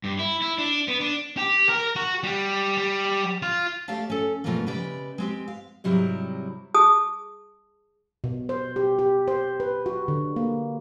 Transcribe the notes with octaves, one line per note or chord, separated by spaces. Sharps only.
G2
E4
E4
D4
B3
D4
G4
A#4
F#4
G3
G3
F4
A3 G4 D5 E5 F5 A5
C#4 A4
B2 E3 F3 G3 A3 A#3
C#3 G#3 G4 B4 D5 E5
G#3 C4 G4
F5
G#2 C3 F#3 G3 E4
G#4 A5 D#6
B2
C5
G4
G4
C5
B4
F#4
D3
A#3